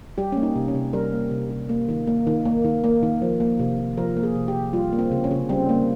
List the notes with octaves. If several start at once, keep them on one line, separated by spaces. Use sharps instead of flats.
G3 G4
A#3 C#4
D#4
C3
C#4
C3
G3 A#4
A#3
C3
C3
A#3
D#3
A#3
D#3
A#3
D#3
A#3
D#3
F3
A#3
C3
C3
F3 A#4
A#3
G#4
C3
G4
C3
G3 F4
A#3
C4
C#3
C#4
C#3
G3 C4
A#3